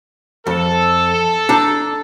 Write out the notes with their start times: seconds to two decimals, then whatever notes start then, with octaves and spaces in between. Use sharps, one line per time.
0.47 F2 A4
1.49 D4 A#5